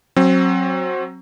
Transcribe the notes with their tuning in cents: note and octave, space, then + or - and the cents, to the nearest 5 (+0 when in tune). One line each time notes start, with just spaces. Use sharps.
F#3 +0 C4 +25